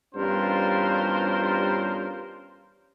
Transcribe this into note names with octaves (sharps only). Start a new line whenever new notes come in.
E2 G2 C#4 F4 A#4 C5